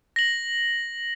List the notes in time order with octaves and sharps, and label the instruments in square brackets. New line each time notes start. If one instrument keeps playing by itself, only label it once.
[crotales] A#6 F#7